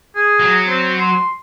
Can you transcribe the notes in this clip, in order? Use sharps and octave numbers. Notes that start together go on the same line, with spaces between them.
G#4
F#3
C4
C6